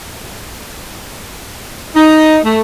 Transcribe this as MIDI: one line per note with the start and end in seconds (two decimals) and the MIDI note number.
1.96 2.37 63
2.44 2.61 57